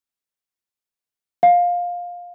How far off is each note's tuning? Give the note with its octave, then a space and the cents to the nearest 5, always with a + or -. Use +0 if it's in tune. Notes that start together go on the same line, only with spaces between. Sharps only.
F5 +15